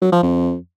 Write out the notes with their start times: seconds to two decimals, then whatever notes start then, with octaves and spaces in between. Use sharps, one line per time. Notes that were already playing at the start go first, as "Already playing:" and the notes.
0.02 F#3
0.12 F3
0.23 F2